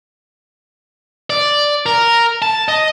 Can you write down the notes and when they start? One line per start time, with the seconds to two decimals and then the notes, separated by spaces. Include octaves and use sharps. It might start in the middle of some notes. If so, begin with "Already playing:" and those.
1.30 D5
1.86 A#4
2.42 A5
2.68 D#5